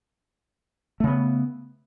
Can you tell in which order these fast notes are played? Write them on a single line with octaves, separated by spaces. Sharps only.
A3 C#3 B3